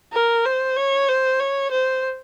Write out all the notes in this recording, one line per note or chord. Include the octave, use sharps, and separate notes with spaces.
A#4
C5
C#5
C5
C#5
C5